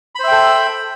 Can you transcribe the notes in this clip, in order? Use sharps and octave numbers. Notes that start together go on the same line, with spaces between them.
A4 C5 E5 G5 B5